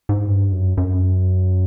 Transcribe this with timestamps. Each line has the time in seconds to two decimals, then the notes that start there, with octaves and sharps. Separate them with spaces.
0.09 G#2
0.27 G2
0.52 F#2
0.77 F#2